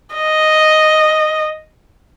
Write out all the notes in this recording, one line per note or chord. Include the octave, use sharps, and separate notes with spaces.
D#5